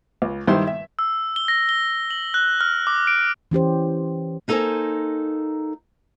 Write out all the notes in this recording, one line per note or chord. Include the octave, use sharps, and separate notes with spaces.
C#2
G2 D#3 G3 E4 C5 C6
E5
E6
G7
A#6
G7
F#7
F#6
F6
D6
D7
E3 C#4 G4 C5
A#3 D#4 A4 A#4 C5 G#5